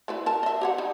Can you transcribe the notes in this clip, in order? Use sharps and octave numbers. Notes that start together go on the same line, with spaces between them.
A3 E4 B4
A#4 A5
D#5 E5
G4 C#5 F#5
G3 D#4